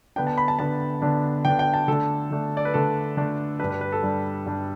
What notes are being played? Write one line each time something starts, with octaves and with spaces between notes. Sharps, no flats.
D3 B3 D4 G5
A5
B5
A5
D3 B3 D4 A5
D3 B3 D4
D3 B3 D4 G5
G5
A5
D3 A3 D4 A4
D3 A3 D4
D5
B4
D3 A3 D4 A4
D3 A3 D4
G2 G3 D4 B4
B4
B4
A4
G2 G3 D4
G2 G3 D4